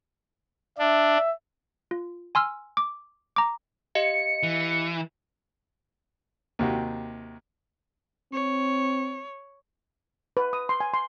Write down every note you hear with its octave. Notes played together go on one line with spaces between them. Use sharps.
D4 E5
F4
G#5 C6 E6 F6
D6
A#5 D6
G4 D#5 F5 C#7
E3
D#2 C3 F#4
C4 C#5
B4
D#6
C6
G#5
C6